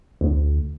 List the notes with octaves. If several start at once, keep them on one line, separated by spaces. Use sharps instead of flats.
D2